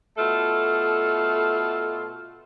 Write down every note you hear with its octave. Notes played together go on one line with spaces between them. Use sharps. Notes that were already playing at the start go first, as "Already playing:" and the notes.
B2 A3 F4 A4